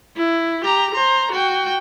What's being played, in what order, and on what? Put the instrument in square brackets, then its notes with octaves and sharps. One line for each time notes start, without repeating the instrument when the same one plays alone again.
[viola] E4
G4 A#5
C5 A#5
F#4 G5